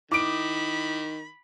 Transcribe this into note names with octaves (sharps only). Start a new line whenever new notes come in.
D#3 E4 B5 D6 D#6 D7